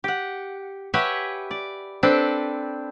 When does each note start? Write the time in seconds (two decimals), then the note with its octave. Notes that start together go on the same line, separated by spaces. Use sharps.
0.04 G4 F#5
0.94 G4 B4 C#5 E5 F#5 G#5
1.51 D5
2.03 C4 D4 A4 B4